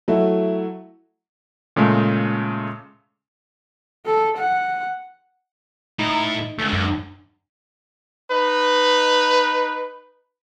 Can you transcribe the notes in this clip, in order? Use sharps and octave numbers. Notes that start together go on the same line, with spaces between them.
F#3 A3 E4
A#2 C#3 G#3 A3
A4
F#5
A2 D#4 E4
C#2 D3 A3
F#2
D#4 B4